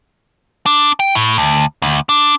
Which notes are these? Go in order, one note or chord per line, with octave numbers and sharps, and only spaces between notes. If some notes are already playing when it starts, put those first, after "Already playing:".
D4
G5
A2
D2
D2
D4